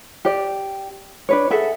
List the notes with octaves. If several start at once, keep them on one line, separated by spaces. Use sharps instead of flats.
G4 D5
D4 B4 C#5
G#4 A4 E5 F#5